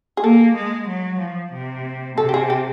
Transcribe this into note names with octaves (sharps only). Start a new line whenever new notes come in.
G#4
A#3 A4
G#3
F#3
F3
C3
C3 A4
G4
G#4
G4